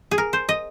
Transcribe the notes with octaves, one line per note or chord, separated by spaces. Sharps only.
G#4
A#4
C5
D#5